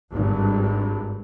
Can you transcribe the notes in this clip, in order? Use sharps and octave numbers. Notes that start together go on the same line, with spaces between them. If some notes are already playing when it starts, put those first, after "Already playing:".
G#1 G2